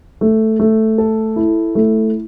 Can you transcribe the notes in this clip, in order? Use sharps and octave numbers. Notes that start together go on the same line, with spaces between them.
A3
A3
A4
E4
A3